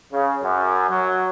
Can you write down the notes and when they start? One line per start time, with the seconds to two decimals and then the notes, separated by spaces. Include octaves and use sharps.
0.13 C#3
0.43 F#2
0.90 F#3